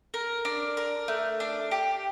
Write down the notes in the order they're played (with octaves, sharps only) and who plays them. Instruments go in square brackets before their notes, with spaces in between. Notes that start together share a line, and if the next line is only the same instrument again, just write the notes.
[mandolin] A#4
D4
A#4
A3
D4
G4